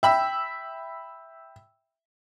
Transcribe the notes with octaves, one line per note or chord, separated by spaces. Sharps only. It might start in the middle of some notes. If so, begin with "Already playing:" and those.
E5 G5 B5 E6